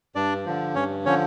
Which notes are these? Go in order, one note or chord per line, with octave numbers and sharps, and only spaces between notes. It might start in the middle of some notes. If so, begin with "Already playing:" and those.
G2 D4 D5
D3 F3
G2 C#4 C#5
D3 F3 C#4 C#5